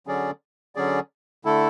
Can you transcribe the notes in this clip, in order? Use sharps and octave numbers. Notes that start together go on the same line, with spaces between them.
D3 F#3 C#4 G#4 D5
D3 F#3 C#4 G#4 D5
D3 A3 E4 A4